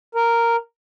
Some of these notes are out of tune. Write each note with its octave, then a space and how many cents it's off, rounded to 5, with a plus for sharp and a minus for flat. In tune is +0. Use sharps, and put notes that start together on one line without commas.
A#4 -5